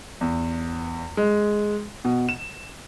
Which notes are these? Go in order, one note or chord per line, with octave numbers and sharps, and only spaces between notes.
E2
G#3
B2
E7